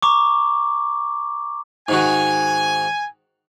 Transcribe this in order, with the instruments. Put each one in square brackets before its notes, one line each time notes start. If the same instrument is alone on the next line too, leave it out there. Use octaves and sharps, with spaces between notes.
[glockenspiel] A#5 C#6 D6
[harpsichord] G#2 D#3 F#4 [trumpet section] G#5